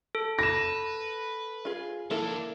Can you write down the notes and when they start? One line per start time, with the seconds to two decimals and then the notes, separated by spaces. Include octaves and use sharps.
0.15 A4
0.39 B4 A#6 E7
1.65 F4 G#4
2.11 D#3 A#3 D4 E4 A4